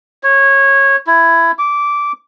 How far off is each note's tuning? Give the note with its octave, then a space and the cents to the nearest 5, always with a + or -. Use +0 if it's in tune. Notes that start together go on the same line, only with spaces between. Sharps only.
C#5 -15
E4 +15
D6 -15